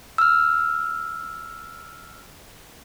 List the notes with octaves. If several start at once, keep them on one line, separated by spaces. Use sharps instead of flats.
E6 F6